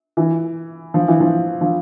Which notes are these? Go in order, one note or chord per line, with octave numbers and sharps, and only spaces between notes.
E3
F3
E3
F3
F3